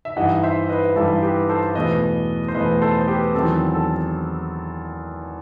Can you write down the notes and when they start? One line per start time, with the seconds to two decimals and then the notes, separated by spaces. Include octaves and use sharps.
0.05 E5
0.17 G2 E3 G3 D#4 D#5 F#5
0.43 C5 E5
0.69 B4 D#5
0.96 G2 E3 G3 D#4 A4
1.22 G4 B4
1.49 A4 C5
1.75 E2 B2 A3 B4 D#5
2.48 C5
2.55 E2 B2 A3 B4 D#5
2.82 A4 C5
3.01 C5
3.08 G4 B4
3.34 E2 D#3 F#3 C4 A4
3.74 A4